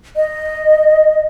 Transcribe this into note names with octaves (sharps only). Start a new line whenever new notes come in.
D#5